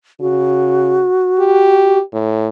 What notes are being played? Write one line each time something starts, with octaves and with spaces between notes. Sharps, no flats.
C#3 F#4
G4
A2